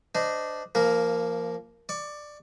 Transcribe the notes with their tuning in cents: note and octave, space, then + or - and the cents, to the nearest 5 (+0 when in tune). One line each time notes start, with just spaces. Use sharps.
D4 +0 C5 -25 D#5 +0
F3 -20 A#3 +0 A#4 +0
D5 +15 C#6 +35